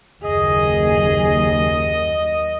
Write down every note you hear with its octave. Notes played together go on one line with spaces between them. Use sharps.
F#1 D#2 G#4 D#5